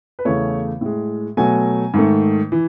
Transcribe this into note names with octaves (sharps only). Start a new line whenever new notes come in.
B4
E2 C#3 E3 A3 C#5
A2 G#3
B2 F#3 A3 G#5
G#2 D#3 A3
E3